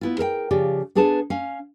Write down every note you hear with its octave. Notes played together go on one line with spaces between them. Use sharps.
B3 E4 F4
G#4 A#4 E5 G5
C#3 F3 G4 D5
B3 D4 G#4 A4 B4 A5
C#4 F5